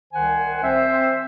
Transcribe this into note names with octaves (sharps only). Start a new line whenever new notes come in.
C2 D#3 C5 F#5 G#5
C4 C5 E5